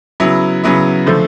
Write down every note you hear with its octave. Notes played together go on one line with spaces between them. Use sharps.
C#3 F#3 B3 E4
C#3 F#3 B3 E4
D3 F3 A3